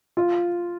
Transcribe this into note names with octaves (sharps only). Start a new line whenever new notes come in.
F4